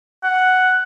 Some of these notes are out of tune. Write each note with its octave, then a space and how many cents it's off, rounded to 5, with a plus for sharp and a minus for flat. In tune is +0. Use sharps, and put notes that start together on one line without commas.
F#5 +5